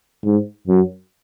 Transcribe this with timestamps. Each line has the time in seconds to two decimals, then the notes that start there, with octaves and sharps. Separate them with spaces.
0.24 G#2
0.67 F#2